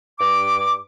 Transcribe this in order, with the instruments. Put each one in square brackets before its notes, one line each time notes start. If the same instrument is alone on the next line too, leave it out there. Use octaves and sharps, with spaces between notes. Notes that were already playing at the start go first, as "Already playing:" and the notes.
[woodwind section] G2 D6